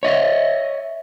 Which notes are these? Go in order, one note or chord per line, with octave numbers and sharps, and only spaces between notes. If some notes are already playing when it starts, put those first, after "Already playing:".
C#5 D#5 E5